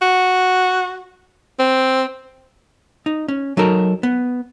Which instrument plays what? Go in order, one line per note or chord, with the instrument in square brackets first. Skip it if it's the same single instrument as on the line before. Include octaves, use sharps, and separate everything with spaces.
[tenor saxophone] F#4
C4
[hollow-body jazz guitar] D#4
C#4
F#3 D#4 A4 A#4
B3